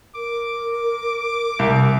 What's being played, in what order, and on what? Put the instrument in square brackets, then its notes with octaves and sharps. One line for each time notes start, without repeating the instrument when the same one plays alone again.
[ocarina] A#4 [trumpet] D6
[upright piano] C2